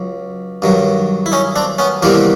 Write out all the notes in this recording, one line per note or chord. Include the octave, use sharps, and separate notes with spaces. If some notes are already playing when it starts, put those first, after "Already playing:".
Already playing: C#2 F#3
G2 D#3 F#3
E4
C#4 D#4
C4 D4
B3 C#4
E2 C3 D#3 G3 A#3 C4